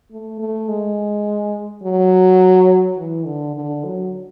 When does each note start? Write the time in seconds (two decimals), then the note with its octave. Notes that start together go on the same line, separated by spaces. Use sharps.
0.11 A3
0.40 A3
0.68 G#3
1.83 F#3
2.97 E3
3.26 D3
3.55 D3
3.84 F#3